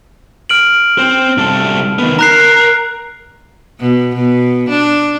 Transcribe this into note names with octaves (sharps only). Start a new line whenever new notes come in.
F6 D7 F#7
C4 C5
C2 A4
D#3 B3
A#4 A#5 F#6 C7
B2
B2
D4